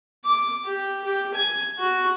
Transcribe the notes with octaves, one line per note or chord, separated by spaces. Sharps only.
D6
G4
G4
G#5
F#4